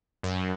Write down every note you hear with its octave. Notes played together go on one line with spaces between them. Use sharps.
F#2